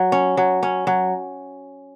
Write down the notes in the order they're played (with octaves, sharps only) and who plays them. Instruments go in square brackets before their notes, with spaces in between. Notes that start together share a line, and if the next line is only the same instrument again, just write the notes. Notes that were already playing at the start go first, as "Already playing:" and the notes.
Already playing: [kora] F#3
C#4
F#3
C#4
F#3